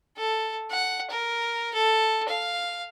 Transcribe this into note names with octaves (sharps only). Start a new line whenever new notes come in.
A4
F#5
A#4
A4
F5